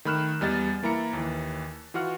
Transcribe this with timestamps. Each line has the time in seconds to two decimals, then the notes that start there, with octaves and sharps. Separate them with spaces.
0.05 D#3 A3 B5 F6 F#6 E7
0.41 E2 G3 D#5 A6
0.83 E3 A#3 E4 A#5 C#7
1.13 D#2 E3
1.94 E3 F4 F#4 F#5 F6